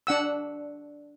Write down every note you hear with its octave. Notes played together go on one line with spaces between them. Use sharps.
D4 F#5 E6